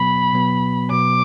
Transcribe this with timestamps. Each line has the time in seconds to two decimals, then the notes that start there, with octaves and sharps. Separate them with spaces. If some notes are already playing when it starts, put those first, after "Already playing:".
Already playing: B2 F#3 B3 B5
0.33 B2 F#3 B3
0.91 B2 F#3 B3 D6